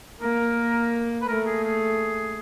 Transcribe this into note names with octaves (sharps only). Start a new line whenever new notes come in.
A#3 A#4
B4
A3 A#4
G#4
G#4